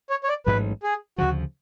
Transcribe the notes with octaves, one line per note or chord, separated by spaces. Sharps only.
C#5
C#5
D5
A1 G#2 F#3 B4
G#4
D2 C#3 F3 F#4